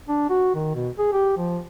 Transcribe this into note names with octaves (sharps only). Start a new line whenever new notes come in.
D4
F#4
D#3
B2
G#4
G4
F3